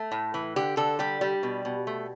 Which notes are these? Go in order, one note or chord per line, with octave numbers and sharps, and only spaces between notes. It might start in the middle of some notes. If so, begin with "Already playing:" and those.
Already playing: A3
A2
E3
D3 G4
D3 A4
G3 G4
G3
B2
B2
A3